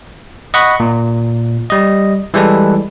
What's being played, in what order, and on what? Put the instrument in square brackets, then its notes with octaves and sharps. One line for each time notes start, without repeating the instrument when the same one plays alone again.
[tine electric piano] D#5 F#5 B5 C#6
A#2
G3 D#5
E3 G3 G#3 A4 B4